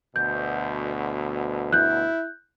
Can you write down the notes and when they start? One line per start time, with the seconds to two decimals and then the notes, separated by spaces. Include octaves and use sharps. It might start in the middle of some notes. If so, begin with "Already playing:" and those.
0.16 D2 B2 G6
1.73 E4 F#6 G6